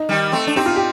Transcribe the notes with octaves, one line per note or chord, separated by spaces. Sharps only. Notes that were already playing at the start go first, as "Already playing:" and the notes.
Already playing: D#4
D#3 G3
A3 C4
D4
C4 D#4 G4
F4
G4